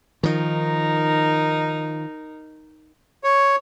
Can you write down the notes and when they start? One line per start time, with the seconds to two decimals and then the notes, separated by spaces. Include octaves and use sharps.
0.23 D#3 F3 D#4 A#4
3.24 C#5